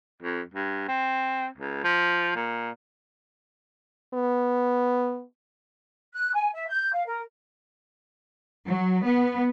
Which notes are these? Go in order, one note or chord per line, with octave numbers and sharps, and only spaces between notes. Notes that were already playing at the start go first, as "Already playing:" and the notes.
F2
G2
C4
C#2
F3
A#2
B3
F#6
G#5
E5
G6
F5
A#4
F#3
B3